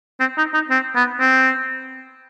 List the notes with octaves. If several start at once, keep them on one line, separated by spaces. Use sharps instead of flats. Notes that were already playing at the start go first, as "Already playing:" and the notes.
C4
D#4
D#4
C4
B3
C4